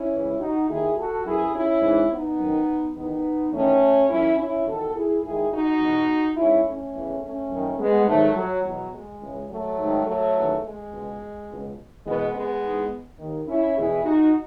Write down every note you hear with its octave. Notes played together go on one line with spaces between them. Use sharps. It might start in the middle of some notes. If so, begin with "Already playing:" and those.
Already playing: C#4 E4
C#2 C#3 E3
D#4 F#4
D#2 D#3 E4 G#4
F#4 A4
F#2 E3 E4 G#4
C#4 E4
G#2 E3
B3 D#4
F#2 D#3
E2 D#3 B3 D#4
E2 D#3 A3 C#4
F#2 E3 C#4 E4
C#4 E4
E2 D#3 F#4 A4
E4 G#4
G#2 D#3 E4 G#4
D#4 F#4
E2 B2
G#2 E3 C#4 E4
A3 C#4
E2 C#3 E3
A3 C#4
F#2 D#3
G#3 B3
G#2 D#3 F#3 A3
F#3
E2 B2 F#3
G#3
C#2 C#3 E3
F#3 A3
G#2 D#3
F#3 A3
D#2 C#3 E3
G#3
C#2 B2
C#2 B2
E2 B2 G#3 B3
G#3 B3
G#2 E3
D#2 D#3
C#4 E4
E2 B2 E4 G#4
D#4 F#4